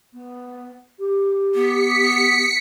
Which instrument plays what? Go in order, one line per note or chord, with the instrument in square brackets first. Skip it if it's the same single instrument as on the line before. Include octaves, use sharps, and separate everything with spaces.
[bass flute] B3
G4
[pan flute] B3 [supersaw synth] B6 C#7